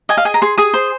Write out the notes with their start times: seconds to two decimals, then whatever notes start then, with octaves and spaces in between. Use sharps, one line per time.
0.09 D#5 G#5
0.17 F5
0.25 G#4 G#5
0.34 A#5
0.42 G#4 C6
0.58 G#4 D#6
0.73 C5 C6